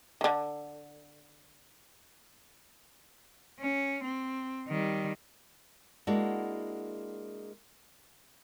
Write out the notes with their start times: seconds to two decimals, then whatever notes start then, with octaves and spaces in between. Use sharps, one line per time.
0.21 D3 D#3
3.60 C#4
4.04 C4
4.68 D#3 G3
6.07 G#3 A#3 D4 E4 F#4